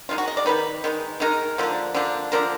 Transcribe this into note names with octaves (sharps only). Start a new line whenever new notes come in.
D#3 G#3 D#4 F4
F#4
D#5
D5
D#3 G#3 D#4 B4
D#3 G#3 D#4
D#3 G#3 D#4 A#4
D3 F3 A#3 D4
D3 F3 A#3 D4
D3 F3 A#3 D4 A#4